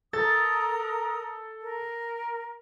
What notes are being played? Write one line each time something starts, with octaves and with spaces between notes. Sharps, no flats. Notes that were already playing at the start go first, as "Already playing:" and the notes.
A4 A#4 A#5 D#6 A6
A#4